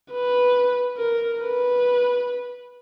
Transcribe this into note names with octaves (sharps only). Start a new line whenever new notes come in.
B4
A#4
B4